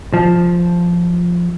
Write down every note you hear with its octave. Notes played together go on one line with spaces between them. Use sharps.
F3